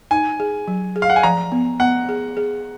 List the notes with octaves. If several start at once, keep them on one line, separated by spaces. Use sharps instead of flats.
D#4 G#5
G#4
F#3
G#4
F5
F#5
G#5
F3 A#5
B3
B3 F#5
G#4
G#4